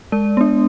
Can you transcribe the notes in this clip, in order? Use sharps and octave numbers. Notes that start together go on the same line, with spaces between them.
G#3 D5
B3 D4